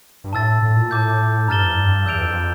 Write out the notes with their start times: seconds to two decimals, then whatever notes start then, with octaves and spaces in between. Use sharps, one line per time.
0.24 G2
0.33 A2 A5 E6 A6
0.62 A2
0.76 A#2
0.91 A2 A5 D6 G6
1.48 G2 A#5 F6 A6 E7 G7
1.62 F2
1.77 G2
2.06 E2 E6 G6 D7 F7
2.21 F2